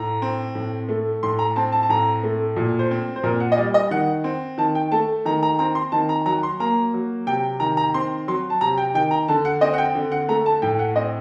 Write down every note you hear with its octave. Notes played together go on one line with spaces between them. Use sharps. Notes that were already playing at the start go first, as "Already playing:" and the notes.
Already playing: A2 A#5
C4
A2
A3
A2 C6
A#5
C4 A5
A5
A5
A2 A#5
A3
A#2
C5
C4
C5
A#2 A#4
F#5
D#5
G3 D5
D#5
D#3 F#5
C4
D#3 A5
G5
A3 A5
D#3 A#5
A#5
C4 A#5
C6
D#3 A5
A#5
F#3 A#5
C6
A#3 A#5
F#3
C3 G5
D#3 A#5
A#5
C4 C6
F#3 C6
A5
C3 A#5
G5
D#3 G5
A#5
D3 A5
F#5
C4 D#5
F#5
G5
D3
F#5
A3 A#5
A5
A2 G5
F#5
C4 D#5